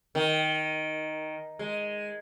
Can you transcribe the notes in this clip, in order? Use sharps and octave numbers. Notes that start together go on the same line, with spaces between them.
D#3
G#3